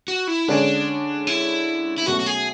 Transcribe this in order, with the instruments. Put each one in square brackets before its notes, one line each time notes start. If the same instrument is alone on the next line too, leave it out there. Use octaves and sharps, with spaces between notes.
[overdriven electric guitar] F#4
E4
[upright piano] D3 G#3 C#4 G#4 D5 [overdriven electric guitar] D4
[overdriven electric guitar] E4
E4
[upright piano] B2 F#3 A3 C#4 [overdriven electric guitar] F#4
[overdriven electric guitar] F#4
G#4